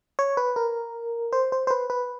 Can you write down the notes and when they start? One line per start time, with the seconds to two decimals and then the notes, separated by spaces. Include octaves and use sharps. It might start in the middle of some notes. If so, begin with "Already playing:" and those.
0.19 C#5
0.37 B4
0.56 A#4
1.33 C5
1.52 C5
1.67 C5
1.71 B4
1.90 B4